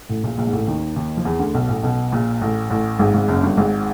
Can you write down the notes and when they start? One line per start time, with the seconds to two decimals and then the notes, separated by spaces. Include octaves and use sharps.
0.09 A1 A2
0.24 A#1 A#2
0.38 A#1 A#2
0.47 G#2
0.52 A1 A2
0.67 D#2 D#3
0.96 D#2 D#3
1.17 F3
1.25 E2 E3
1.39 D2 D3
1.54 B1 B2
1.69 A1 A2
1.83 B1 B2
2.12 A#1 A#2
2.41 A1 A2
2.70 A1 A2
2.99 G#1 G#2
3.14 G#1 G#2
3.28 F#1 F#2
3.43 G1 G2
3.57 G#1 G#2